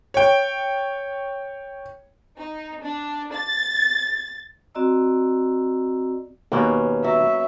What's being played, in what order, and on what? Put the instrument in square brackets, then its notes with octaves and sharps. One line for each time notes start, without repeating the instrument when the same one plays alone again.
[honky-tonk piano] C#5 G5
[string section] D#4
D4
A6
[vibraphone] C4 F#4 D5 D#5 A#5 E6
[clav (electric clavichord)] D#2 B2 [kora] A#3 B3 C#4
[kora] F#3 [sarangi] E5